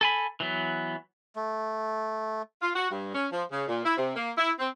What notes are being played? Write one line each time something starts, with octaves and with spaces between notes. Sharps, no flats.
A4 G#5 B5
E3 F#3 B3
A3
F4
F#4
G2
C#4
F3
C#3
A#2
E4
C3
A#3
E4
C4